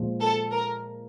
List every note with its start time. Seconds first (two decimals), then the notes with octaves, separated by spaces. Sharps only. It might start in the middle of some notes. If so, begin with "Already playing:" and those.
Already playing: A#2 F3 G#3
0.20 A4
0.51 A#4